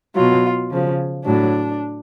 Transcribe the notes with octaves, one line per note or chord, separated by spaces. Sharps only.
B2 F#3 F4
C#3 F3
A2 F#3 D4